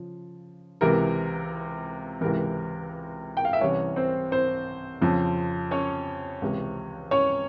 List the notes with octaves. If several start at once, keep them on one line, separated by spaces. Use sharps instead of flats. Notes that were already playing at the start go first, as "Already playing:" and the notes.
Already playing: C#3 F3
C#2 C3 E3 A#4
C#2 C3 E3 A#4
G5
F5
E5
C2 C3 E3 C#4 C#5
C4 C5
C4 C5
F2 C#3 F3
C#4 C#5
C#2 C3 E3
C#4 C#5